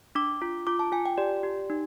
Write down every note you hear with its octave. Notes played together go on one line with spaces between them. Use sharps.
D4 D6
F4
F4 D6
A5
F4 G#5
G5
G4 D5
G4
D#4